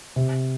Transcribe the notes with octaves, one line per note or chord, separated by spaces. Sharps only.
C3